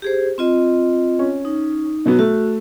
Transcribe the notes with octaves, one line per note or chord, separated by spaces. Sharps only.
G4 G#4 C5
C4 F4 D#5
C#4
D#4
B2 F#3 B3
A3 F#4